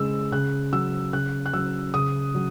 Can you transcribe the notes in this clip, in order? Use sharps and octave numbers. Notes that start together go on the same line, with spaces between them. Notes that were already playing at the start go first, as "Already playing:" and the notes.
Already playing: C#3 G#3 E6
C#3 F#6
F#3 E6
C#3 F#6
F#6
F#3 E6
C#3 D#6
F#3